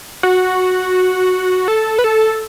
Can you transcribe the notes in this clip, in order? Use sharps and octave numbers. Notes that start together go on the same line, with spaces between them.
F#4
A4
B4
A4